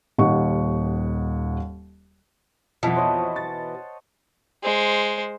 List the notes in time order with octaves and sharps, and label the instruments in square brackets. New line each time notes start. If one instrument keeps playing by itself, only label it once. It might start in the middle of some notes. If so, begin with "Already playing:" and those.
[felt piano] D#1 D#2 D#4 D#5 F#5 C#6
[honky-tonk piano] F2 F3 [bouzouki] B2 E3 [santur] F#5 A5
[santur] C5 C#5 D#5
[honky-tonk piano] A6
[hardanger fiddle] G#3 C5